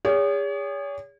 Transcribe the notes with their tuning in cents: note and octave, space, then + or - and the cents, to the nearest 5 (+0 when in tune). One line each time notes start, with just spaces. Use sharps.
G#4 -35 C#5 +40